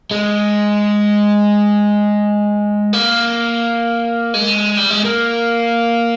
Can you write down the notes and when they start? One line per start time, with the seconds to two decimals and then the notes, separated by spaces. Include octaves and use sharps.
0.11 G#3
2.93 A#3
4.34 G#3
4.77 G3
4.91 G#3
5.05 A#3